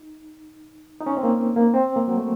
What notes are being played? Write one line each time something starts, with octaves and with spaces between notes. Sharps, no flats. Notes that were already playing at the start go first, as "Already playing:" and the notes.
Already playing: D#4
D#4
C#4
C4
A#3
A#3
C4
A#3
F#3
A3